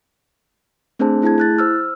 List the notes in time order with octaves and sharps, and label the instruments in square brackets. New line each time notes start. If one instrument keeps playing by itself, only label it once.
[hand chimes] A3 C4 D4 G#4 C5 A5
A3 E4 G#4 A5 G#6
E4 F#6 A6
C5 E6 F6